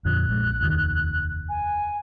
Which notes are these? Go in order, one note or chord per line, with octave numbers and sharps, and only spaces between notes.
F2 A#2 D3 F#6
A#1 G#3
F1 D#2 D#3
G#5